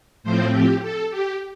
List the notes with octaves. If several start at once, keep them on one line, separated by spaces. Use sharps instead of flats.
A2 F3 C4 C5
G4
A4
G4